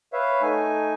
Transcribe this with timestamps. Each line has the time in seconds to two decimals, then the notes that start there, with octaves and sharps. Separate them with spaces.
0.13 B4 C#5 E5 F5
0.42 A3 D#4 G#5